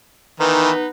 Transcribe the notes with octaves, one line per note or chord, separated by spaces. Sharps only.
D#3 E3 B3 D#4 B4